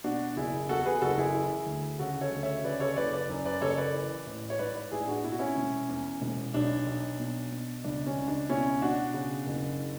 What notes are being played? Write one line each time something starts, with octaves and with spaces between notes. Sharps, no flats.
B2 D4 F#4
F#1 E4 G#4
E2 F#4 A4
G#4 B4
F#1 F#4 A4
E4 G#4
E3
D2
C#3 F#4 A4
A4 C#5
D2
C#5 E5
C#3 B4 D5
A4 C#5
F#1 B4 D5
B4 D5
F#2
B4 D5
F#1 A4 C#5
B4 D5
E3
A1
C#5
G#2 B4 D5
B4 D5
A1 E4 G#4
D4 F#4
B2 E4
F#4
C#4 E4
E1
E2
E1
B1 D4
B1
B2
B2
C#2 D4
C#4
C#2
D4
B2 C#4 E4
B2 D4 F#4
C#3
F#1